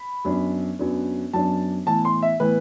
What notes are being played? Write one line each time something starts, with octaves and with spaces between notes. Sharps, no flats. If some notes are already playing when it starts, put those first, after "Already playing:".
Already playing: B5
F#2 F#3 B3 D4
F#2 F#3 B3 D4
F#2 F#3 B3 D4 A5
A2 E3 B3 A5
C6
E5
A2 E3 B3 B4